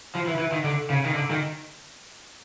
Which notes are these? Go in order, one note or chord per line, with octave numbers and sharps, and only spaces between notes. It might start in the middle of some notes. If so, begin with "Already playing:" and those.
F3
E3
E3
D#3
D3
C#3
D#3
D3
D#3